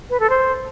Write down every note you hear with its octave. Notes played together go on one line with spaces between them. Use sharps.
B4
A4
C5